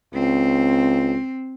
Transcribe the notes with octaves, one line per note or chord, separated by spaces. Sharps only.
C#2 C4